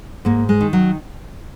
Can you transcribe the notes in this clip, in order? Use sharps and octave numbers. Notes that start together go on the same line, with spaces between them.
G#2 A#3
G#3
D#3
F#3